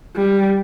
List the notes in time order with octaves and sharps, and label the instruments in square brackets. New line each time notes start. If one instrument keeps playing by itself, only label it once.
[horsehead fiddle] G3